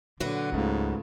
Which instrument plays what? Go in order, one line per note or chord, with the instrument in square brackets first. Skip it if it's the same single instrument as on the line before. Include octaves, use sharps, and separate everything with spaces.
[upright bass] A#2 [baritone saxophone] D3 [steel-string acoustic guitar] F#3 F#4 B4
[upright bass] C#2 B3 [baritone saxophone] G#2 [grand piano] C#3 A3 F4